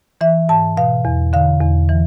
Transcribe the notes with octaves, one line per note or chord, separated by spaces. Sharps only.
E3 E5
G#2 A5
B2 F5
E2
D3 F5
E2
E3